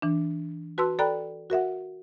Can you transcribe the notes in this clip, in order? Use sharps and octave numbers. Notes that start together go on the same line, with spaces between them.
E3 D4
F#4 B4 A5 C6 E6
A4 D5 G5 A#5 B5 F#6
F#4 A#4 E5 F#5